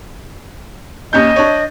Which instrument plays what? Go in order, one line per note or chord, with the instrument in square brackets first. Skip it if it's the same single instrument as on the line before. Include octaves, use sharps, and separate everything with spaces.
[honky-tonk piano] D#2 C#4 G6 [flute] D#5
[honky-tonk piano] D4 C#5